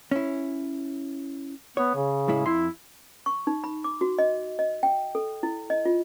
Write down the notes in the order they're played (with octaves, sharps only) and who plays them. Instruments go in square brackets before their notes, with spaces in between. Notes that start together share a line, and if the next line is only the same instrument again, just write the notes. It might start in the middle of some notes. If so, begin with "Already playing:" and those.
[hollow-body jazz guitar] C#4 E4
[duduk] B3 [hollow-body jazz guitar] C#5
[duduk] C#3
[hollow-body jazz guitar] A2 G#3 E4
[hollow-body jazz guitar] F2 C6 [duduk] E4
[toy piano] C#6
D#4
B5
D6
F#4
D#5
D#5
G5
A4
E4
D#5
F4